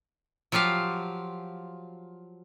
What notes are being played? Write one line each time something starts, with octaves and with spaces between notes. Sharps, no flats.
F3 F#3 F4 G4 F5